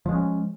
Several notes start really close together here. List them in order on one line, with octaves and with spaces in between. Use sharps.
F3 G#3 C#4